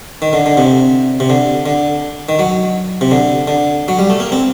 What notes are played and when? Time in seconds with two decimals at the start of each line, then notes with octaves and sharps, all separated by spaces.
0.22 D#3
0.33 D3
0.46 D3
0.57 C3
1.20 C3
1.30 D3
1.66 D3
2.29 D#3
2.39 F#3
3.01 C3
3.11 D3
3.48 D3
3.88 F#3
3.99 G3
4.10 A3
4.20 A#3
4.32 C4